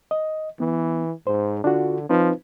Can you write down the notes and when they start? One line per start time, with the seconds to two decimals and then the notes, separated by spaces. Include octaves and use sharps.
0.11 D#5
0.60 E3 B3
1.27 G#2 C5
1.64 D3 D4 F4 F#4
2.09 F3 C4 D#4 B4